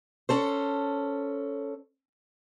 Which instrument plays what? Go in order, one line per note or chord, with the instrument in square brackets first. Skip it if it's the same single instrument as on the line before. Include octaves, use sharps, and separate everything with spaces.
[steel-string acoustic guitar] C#4 A4 C5